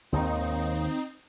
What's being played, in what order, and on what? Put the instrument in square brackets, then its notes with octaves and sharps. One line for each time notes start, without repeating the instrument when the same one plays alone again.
[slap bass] D#2 G#2 D#3 [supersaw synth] C4 D#4